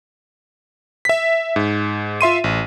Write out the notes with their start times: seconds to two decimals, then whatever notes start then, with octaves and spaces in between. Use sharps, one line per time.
1.05 E5 B6
1.56 G#2
2.21 F4 E5 C6 D#7
2.44 A1